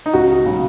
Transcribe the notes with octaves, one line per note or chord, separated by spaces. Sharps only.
D#4
C#2 F#4
C#3 F#3